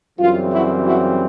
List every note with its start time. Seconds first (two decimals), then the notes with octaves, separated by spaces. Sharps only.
0.18 F#2 C#3 E3 G3 C4 F4
0.51 E4 F#4
0.85 E4 F#4